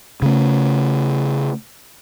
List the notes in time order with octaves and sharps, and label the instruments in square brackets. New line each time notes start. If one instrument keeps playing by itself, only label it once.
[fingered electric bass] C#3 A3